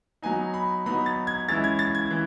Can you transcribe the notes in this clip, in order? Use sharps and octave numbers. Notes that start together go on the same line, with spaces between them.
F#3 B3 D#4 G#5
B5
F#3 B3 D#4 B5
A6
G#6
E3 G#3 C#4 E4 A6
G#6
A6
G#6
E3